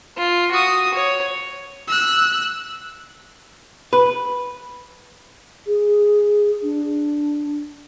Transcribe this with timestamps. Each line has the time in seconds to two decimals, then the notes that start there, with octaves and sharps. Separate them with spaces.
0.17 F4
0.51 F#4 D#6
0.94 C#5
1.88 E6 F#6
3.93 B4
5.66 G#4
6.63 D4